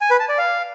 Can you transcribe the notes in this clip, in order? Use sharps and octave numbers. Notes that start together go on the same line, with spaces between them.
G#5
B4
A5
D5
F5